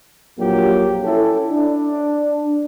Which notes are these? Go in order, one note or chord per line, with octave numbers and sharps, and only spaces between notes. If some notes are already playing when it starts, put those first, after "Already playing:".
A#1 F2 A#2 F#3 A#3 G4
C#4 E4 A4
D4